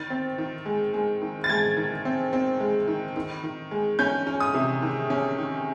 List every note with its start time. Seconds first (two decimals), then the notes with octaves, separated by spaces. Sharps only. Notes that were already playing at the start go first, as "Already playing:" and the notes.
Already playing: D#3 A6
0.10 C4
0.38 D#3
0.66 G#3
0.94 G#3
1.22 D#3
1.44 A6
1.49 G#3 G#6
1.77 D#3
2.05 C4
2.33 C4
2.60 G#3
2.88 D#3
3.16 D#3
3.43 D#3
3.71 G#3
3.99 C#4 G6
4.27 C#4
4.40 D#6
4.54 C3
4.82 D#3
5.10 C#4
5.38 D#3